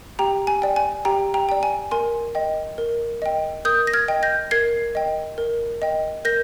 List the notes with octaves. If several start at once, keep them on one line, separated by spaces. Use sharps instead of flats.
G4 G5 A#5
G#5
D5 G5
G#5
G4 G5 A#5
G5 A#5
D5 G5
G#5
A#4 G#5 C6
D#5 G5
A#4
D#5 G5
A#4 D#6 G6
A#6
F6 G#6
D#5 G5
G6 A#6
A#4 G#6 C7
D#5 G5
A#4
D#5 G5
A#4 G6 A#6